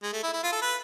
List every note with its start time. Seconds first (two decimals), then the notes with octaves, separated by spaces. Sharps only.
0.03 G#3
0.13 A3
0.23 E4
0.33 E4
0.43 F4
0.52 A4
0.62 B4